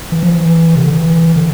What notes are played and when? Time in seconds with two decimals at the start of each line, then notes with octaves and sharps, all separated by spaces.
0.12 E3
0.23 F3
0.34 E3
0.76 C3
0.86 D3
0.94 E3
1.36 D3